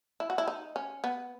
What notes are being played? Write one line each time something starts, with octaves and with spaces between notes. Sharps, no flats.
E4
F#4
E4
D#4
C#4
B3